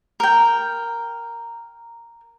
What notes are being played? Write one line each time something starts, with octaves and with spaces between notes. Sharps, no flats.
A#4 G5